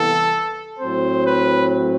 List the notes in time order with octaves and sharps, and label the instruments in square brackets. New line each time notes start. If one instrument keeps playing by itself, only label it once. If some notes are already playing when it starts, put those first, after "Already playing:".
Already playing: [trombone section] C2 C3 E3 B3 [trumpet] A4
[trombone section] A2 F#3 C4 [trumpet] C5
[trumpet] B4